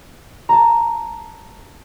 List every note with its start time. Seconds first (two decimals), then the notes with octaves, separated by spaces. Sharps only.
0.49 A5 A#5